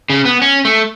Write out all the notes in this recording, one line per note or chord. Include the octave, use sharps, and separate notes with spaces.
C#3
B3
C#4
A3